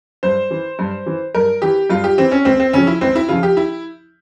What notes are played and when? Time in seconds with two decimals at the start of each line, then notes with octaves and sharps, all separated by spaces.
0.23 G2 C5
0.51 E3
0.79 G2
1.06 E3
1.35 G2 A#4
1.62 E3 G4
1.90 G2 F4
2.04 G4
2.18 E3 C4
2.32 C#4
2.45 C#2 C4
2.60 C4
2.73 C#3 F3 C#4
2.87 E4
3.01 C#2 C4
3.16 E4
3.29 C#3 F3 F4
3.43 G4
3.57 E4